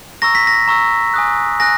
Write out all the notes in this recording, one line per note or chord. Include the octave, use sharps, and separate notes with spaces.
A#5 C#6 E6 A#6
B6
A#6
A#5 C#6 E6
G#5 D#6 F#6
G#5 D#6 F#6 A#6